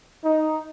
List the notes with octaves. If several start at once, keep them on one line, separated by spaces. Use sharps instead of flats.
D#4